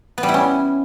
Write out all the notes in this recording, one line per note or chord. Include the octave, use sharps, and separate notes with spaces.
B3
G3
E4
C#4